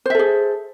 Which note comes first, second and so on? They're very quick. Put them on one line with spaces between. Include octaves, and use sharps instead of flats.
C5 E5 A4 G#4